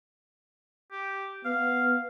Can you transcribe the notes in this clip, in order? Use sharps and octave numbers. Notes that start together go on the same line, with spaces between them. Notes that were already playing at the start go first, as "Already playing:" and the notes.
G4
B3 F5